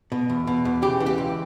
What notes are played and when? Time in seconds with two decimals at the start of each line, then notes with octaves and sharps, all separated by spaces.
0.12 B2
0.30 E2
0.47 B2
0.65 E2
0.82 C#3 G4
1.00 E3
1.06 G4
1.18 C#2